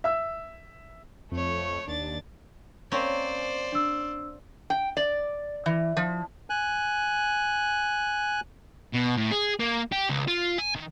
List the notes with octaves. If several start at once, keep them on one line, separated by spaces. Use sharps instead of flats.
E5 E6
F2 A3 C#5
D#2 D4 A6
A#3 C4 C#4 C5 D5
D4 E6
G5
D5
E3
F3
G#5 F#6
B2
A2
G#4
A#3
G4
C#2
F4
G#5
D#3